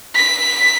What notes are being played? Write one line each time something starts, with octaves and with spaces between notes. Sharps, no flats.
B6